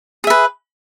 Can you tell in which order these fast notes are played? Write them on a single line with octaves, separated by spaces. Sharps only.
G#4 E5 B4